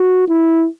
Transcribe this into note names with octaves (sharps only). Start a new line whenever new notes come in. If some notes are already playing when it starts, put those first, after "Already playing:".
Already playing: F#4
E4